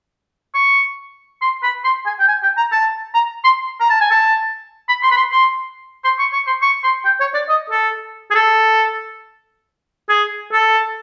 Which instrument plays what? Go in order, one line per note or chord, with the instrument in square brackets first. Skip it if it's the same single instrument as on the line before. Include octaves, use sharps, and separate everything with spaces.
[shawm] C#6
C6
B5
C6
G#5
G5
G#5
G5
A#5
A5
A#5
C6
A#5
A5
G#5
A5
B5
C6
B5
C6
C6
C6
C#6
C#6
C6
C#6
C6
G5
C#5
D5
D#5
A4
G#4
A4
G#4
A4